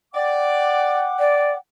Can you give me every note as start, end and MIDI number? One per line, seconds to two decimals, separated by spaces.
0.15 1.11 74
0.15 1.57 78
0.15 1.57 79
0.15 1.57 86
1.19 1.51 74